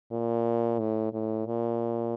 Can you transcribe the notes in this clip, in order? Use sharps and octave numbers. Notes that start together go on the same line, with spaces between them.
A#2
A2
A2
A#2